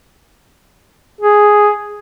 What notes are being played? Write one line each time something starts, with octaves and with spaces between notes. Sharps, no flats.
G#4